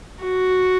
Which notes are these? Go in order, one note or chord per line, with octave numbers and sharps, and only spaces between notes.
F#4